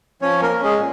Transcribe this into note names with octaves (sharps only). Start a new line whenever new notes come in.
F3 C#4 C#5
A#3 A#4
C#4
G#3 G#4
A#2